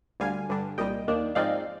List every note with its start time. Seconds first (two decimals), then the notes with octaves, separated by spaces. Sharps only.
0.20 D2 D3 G3 F5 G#5
0.49 G2 D3 G3 D4
0.78 C2 A#2 G3 D#5 G5
1.08 D#2 D#3 A#3 D4
1.35 G#2 F3 G#3 C4 D#4 D5 F5